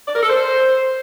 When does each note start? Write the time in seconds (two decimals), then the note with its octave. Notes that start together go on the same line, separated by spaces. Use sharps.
0.07 D5
0.14 A#4
0.22 A4
0.30 C5